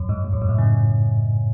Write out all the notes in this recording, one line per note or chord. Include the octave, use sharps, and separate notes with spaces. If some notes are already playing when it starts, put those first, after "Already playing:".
Already playing: F#2
G#2
G#2
F#2
G#2
A2
C#3